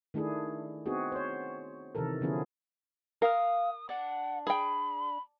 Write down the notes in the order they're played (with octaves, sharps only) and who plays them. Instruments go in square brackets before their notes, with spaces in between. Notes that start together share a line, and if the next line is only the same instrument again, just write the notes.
[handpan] D#3 A3 D4 E4 G#4
B3 C4 D#4 F#4 G#4
C5 C#5
C3 D#3 E3 A4 A#4
D3 F3 B3 C#4 E4 G#4
[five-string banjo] A#4 [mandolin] F5 F6 [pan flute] D#6
[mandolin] D4 [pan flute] F#5
[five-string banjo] G#4 G5 [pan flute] B5